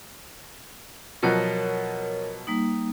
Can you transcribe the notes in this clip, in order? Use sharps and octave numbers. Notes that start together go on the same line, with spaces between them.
B2 F3 F#3 A#4 C#5
G3 A#3 D#4